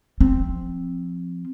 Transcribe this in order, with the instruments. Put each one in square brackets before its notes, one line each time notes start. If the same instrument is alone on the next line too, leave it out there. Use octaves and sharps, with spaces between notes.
[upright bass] F3 C4